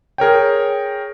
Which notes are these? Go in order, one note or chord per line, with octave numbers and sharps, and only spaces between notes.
G#4 A#4 C#5 G5